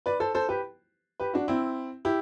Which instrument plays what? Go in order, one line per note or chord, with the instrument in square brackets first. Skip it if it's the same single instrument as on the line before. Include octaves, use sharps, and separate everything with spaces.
[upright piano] B4 D5
A4 C5
A4 C5
G4 B4
G4 B4
D4 F#4
C4 E4
E4 G4